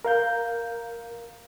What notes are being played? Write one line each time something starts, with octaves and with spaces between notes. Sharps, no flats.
A#4 F5 G6